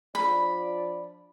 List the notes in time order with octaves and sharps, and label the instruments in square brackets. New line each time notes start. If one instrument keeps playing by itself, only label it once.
[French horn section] F3 D4 D5 [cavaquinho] B5